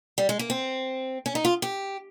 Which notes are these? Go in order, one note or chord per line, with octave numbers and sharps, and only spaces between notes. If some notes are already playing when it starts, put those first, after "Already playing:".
G3
G#3
A#3
C4
C#4
D#4
F4
G4